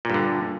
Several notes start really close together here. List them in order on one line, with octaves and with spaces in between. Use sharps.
A#2 G2 D3